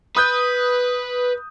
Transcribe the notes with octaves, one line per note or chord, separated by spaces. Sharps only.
B4 D#6 F#6 G6